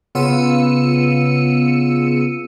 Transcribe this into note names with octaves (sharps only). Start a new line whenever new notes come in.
C#3 B3 F4 E6 C#7 D#7